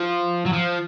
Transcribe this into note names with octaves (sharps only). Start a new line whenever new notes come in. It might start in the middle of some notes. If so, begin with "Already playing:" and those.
Already playing: F3
F#3
F3